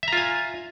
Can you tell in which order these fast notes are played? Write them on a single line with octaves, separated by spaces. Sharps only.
E5 A#5 F4 G#5